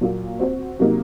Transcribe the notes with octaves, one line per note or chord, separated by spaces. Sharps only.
A#2 F#3 A#3 F4
C4 F#4 C5
C3 F#3 A#3 D#4